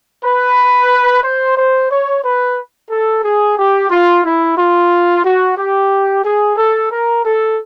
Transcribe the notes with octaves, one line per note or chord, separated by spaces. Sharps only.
B4
C5
C5
C#5
B4
A4
G#4
G4
F4
E4
F4
F#4
G4
G#4
A4
A#4
A4